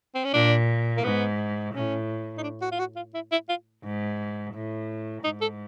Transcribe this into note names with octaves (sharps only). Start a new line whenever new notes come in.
C4
C#4
A#2 D4
A#3
G#2 B3
A2 C#4
D#4
D4
F#4
F4
F#4
F4
E4
E4
F4
G#2
A2
G#2 D#4
A4